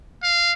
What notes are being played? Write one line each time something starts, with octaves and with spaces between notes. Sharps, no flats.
F5